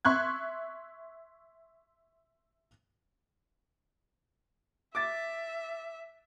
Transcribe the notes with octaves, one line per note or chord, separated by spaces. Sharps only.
E5 C6 C#6 F#6 G#6
E5 D6 A6